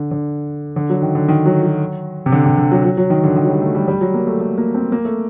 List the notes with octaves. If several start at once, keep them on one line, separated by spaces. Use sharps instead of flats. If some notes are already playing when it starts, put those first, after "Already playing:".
Already playing: D3
D3
D3
F#3
D#3
D3
D#3
F#3
F#3
C3
D3
C3
D3
F#3
F#3
F#3
D#3
D3
D#3
F#3
G3
A3
G3
G3
F#3
A#3
A3
A3
A#3
C4
A#3
A3